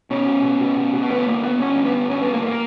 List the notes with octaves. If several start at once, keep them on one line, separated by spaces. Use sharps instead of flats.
B2 C#4
B2
B2
B2
B2
B2
G1 B3
G2 A#3
G2 B3
G1 C#4
G2
B3
G1
G2 C#4
G1 B3
A#3
A#3